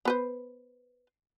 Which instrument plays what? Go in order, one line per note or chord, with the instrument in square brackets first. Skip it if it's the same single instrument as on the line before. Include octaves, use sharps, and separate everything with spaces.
[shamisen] B3 B4 C5